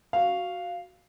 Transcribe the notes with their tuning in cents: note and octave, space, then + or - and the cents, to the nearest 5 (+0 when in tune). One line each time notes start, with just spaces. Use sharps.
F#4 +0 F5 +0